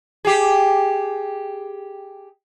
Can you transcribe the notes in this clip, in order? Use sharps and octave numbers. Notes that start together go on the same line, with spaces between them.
G4 G#4